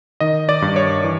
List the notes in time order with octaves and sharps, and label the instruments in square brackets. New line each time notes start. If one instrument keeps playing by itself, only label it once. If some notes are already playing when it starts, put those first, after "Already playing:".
[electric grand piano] D#3 D#5
D5
G2
C#5
E3